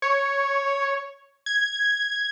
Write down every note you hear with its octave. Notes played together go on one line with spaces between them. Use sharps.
C#5
G#6